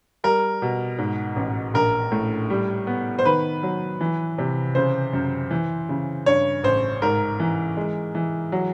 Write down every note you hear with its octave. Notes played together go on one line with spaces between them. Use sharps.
G3 A#4
B2
G#2
A1
A#1 A#4
A2
G3
B3
C5
D#3 B4
F#3
E3
C3
C#3 C5
F#2
E3
C#3
G2 C#5
A1 C5
G#2 A#4
E3
G#3
E3
F#3